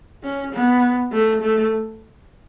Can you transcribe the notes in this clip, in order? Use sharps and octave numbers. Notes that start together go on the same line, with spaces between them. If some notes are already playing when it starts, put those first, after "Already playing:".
C#4
B3
A3
A3